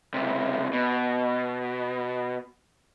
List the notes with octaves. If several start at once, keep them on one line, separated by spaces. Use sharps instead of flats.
C#2 C3
B2